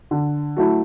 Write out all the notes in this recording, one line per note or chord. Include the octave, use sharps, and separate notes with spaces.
D3
F#3 A3 E4